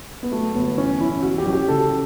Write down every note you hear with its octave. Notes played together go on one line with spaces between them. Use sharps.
B3
F#3 A3
G1 B3
E3 C#4
A1 E4
E3 F#4
G4
A1 F#4
G4
C#3 A4